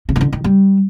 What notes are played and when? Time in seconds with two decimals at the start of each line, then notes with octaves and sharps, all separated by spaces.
0.09 C#3
0.16 D#3
0.21 D3
0.33 D#3
0.44 G3